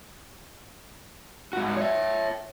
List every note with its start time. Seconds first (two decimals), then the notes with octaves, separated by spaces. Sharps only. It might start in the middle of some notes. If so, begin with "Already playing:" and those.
1.53 G#2 F#4
1.77 C#5 E5